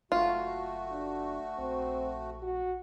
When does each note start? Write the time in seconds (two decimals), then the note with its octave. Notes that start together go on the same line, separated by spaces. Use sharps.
0.12 F#1 A3 F4 F#4
0.91 D4
1.58 A#1 C4
2.42 F#4